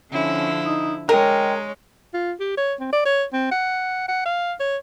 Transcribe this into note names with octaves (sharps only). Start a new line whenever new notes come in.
D3 F3 C#4 E4
D#4 D#6
G#3 A#4 C#5 D#5 G5
F4
G4
C#5
C4
D5
C#5
C4
F#5
F#5
F5
C#5